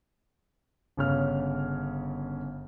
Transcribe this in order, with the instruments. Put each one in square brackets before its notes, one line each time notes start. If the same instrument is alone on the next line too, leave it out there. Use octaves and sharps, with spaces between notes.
[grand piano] G1 C#3 C#5 F6